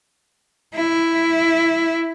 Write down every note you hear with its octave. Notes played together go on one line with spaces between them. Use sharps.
E4